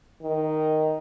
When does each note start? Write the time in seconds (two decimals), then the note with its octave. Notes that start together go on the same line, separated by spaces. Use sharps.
0.22 D#3